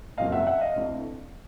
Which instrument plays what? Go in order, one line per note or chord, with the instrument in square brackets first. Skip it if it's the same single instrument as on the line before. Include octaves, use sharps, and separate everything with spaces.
[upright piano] F#1 F2 C#3 F#3 A#3 D#5 F5
E5 F#5
E5 F#5
D#5 F5
D2 C3 E3 A3 D4